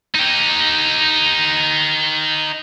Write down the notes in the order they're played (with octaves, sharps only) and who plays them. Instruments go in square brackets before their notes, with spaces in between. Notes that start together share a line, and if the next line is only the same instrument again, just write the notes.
[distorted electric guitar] D#4 G4